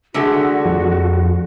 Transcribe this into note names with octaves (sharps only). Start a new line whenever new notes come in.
D3 G#3 A3 F#4
F2